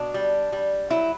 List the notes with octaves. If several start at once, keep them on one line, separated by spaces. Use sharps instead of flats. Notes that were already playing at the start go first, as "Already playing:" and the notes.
Already playing: B2 D4
G3
G3
F#3 E4